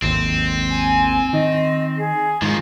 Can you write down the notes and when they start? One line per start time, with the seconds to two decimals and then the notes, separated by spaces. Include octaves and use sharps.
0.02 G#1 D#2 C4
0.71 G#5
1.33 D#3 D#5
1.98 G#4
2.42 G#2 D#3 F3